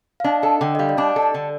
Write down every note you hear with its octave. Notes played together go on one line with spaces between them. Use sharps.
F5
D4 D#5
A4 D#5
D3 G5
D#5
G3 F5
D5
D4 D#5
A4
D5
D3